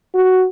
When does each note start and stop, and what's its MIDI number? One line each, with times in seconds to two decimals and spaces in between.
0.14 0.46 66